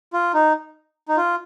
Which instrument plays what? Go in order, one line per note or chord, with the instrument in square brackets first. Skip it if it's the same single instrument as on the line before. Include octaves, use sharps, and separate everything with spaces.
[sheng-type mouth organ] F4
D#4
D#4
F4